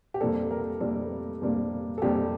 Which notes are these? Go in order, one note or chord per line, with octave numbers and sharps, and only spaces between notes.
G4
F2 C3 G3 A#3 D4 A4
A#4
F2 C3 G3 A#3 D4 A4
F2 C3 G3 A#3 D4
A4
F2 C3 G3 A#3 D4 G4